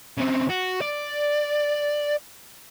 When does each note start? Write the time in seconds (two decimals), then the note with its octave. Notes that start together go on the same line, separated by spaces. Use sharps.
0.17 C#3 C4
0.49 F#4
0.81 D5